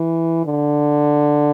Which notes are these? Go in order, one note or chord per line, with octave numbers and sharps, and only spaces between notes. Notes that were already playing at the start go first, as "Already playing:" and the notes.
Already playing: E3
D3